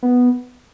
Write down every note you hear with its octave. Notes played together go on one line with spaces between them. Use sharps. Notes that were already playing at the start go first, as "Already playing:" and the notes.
B3